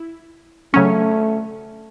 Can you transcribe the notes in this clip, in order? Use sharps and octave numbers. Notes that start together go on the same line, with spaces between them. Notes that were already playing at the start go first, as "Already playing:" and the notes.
Already playing: E4
C#3 F#3 A3 C#4